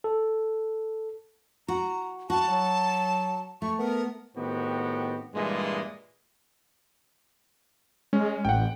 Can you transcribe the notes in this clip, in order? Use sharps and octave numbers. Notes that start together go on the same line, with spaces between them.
A4
F#4 A#5
F#4 A5
F#3
A3 C#6
B3 A#4
A2 D#3 B3 C4 F#4 G4
G2 A#2 E3 G#3
G#3 C#4
A1 F#5 G5